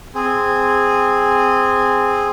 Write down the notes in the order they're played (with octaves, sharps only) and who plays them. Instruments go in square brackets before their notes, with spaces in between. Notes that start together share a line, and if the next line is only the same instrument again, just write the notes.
[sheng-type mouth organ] C4 G#4